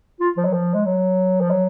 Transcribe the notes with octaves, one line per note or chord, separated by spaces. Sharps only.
F4
F3
F#3
F3
G#3
F#3
F3
F#3